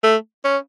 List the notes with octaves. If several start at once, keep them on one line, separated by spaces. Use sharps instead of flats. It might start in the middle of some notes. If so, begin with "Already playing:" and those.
A3
C#4